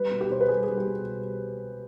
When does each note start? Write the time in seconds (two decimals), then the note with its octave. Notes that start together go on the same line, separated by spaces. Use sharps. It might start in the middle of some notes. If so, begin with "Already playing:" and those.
Already playing: G3 B4
0.11 B2
0.21 G4
0.30 B2 C5
0.41 B4
0.49 G3 G#4
0.63 G3 G#4
0.77 G4
0.86 B2